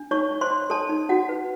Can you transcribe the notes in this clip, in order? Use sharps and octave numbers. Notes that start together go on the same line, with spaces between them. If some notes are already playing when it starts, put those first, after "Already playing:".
Already playing: D4
D#4 C#5 C#6
D#4
C5 C6
C#5
A4 C#5 A5
D#4
D#4 F#4 F#5
B4